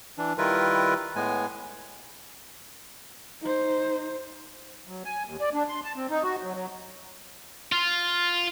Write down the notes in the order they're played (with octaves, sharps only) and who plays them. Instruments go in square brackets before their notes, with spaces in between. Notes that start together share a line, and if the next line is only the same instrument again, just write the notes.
[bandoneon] E3 D4
D#3 G3 E4 F4 A#4 B4
A2 G#3 B3 G#5
[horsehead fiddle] D#4 C5
[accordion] F#3
G#5
D#2
D5
D4
C6
A5
C4
D#4
F#4
F#3
F#3
[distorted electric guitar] F4